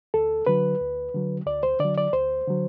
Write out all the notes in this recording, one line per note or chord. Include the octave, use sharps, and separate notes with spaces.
D2 A4
D3 F#3 B4
D2
D3 F#3
D2 D5
C5
D3 F#3 D5
D5
D2 C5
D3 F#3